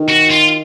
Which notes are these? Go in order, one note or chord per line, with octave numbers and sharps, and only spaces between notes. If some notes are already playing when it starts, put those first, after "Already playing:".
Already playing: D#3
F#4
F4